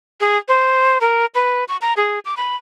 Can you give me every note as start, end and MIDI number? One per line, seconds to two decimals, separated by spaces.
0.21 0.38 68
0.49 0.98 72
1.01 1.26 70
1.35 1.64 71
1.68 1.77 85
1.82 1.93 82
1.97 2.19 68
2.25 2.35 86
2.37 2.56 83